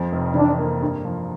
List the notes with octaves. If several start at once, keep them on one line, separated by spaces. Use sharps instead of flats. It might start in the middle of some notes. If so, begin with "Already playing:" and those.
Already playing: F2 F3
F1
E3 D4
A#3
G2
F3